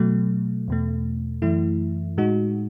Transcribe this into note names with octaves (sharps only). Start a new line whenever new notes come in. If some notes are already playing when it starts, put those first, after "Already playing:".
Already playing: B2 F#3 A3
E2 B2 A3
F#2 E3 A3 E4
A2 G#3 D#4 F#4